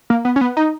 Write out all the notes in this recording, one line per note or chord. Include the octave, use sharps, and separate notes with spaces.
A#3
B3
C#4
B3
D#4